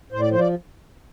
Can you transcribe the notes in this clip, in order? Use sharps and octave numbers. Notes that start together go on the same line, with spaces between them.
A2 C5
D5
F3 C5
D5